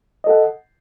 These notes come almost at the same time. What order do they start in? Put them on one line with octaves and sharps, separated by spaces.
D#5 A4 F#5